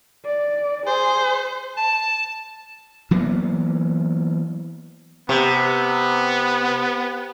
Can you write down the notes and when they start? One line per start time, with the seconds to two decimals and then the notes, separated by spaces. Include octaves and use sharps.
0.25 D5
0.87 G#4 C5
1.77 A5
3.11 E3 F#3 A#3 B3
5.29 C3 B3